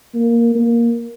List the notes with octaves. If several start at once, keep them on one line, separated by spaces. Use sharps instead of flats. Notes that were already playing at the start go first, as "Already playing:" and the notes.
A#3
A#3